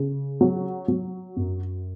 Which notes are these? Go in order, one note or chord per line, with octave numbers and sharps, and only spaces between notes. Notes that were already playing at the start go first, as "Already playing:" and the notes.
Already playing: C#3
F#3
F#3
F#2